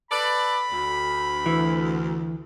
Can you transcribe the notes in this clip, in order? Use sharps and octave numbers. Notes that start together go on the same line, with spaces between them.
A4 B4 D5 B5
D2
E3